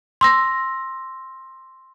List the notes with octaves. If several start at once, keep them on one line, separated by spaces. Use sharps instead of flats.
C6 E6 A#6